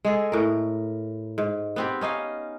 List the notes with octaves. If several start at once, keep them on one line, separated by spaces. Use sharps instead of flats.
G#3 G#4 A4
A2 A#4
G#2
B3 C4 G4
C#4 D#4 D#5 F5